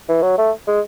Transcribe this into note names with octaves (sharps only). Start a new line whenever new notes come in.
E3
F#3
A3
G#3